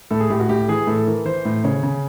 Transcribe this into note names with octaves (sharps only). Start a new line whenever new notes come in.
A2 A4
G#4
A2 G4
F#4
A2 G4
E3 G#4
A2 A4
E3 A#4
E3 C5
A2
C#3 C#5
C#3